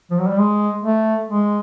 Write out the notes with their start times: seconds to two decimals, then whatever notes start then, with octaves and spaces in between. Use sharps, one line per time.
0.11 F3
0.19 F#3
0.28 G3
0.38 G#3
0.84 A3
1.29 G#3